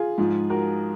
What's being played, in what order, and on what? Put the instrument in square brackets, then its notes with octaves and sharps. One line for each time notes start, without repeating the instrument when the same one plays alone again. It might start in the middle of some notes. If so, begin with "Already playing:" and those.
Already playing: [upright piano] F4 G#4
G#2 F3
F#4 A#4